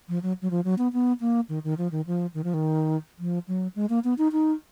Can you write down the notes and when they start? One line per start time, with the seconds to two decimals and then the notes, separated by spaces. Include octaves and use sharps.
0.09 F3
0.23 F#3
0.42 F#3
0.51 F3
0.65 F#3
0.78 B3
0.93 B3
1.21 A#3
1.49 D#3
1.64 D#3
1.78 F3
1.92 D#3
2.07 F3
2.34 D#3
2.44 F3
2.54 D#3
3.19 F3
3.48 F#3
3.76 G#3
3.89 A#3
4.04 B3
4.18 D#4
4.32 D#4